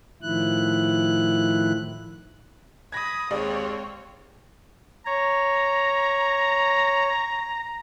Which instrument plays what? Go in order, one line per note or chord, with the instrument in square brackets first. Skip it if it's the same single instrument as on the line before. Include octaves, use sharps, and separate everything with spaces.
[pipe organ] A2 D#3 F3 E4 F#6
[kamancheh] B5 D#6 [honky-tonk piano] G#6 A#6
[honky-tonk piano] D#2 G#3 D5 [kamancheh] C4 C#5
[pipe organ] C#5 [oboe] A#5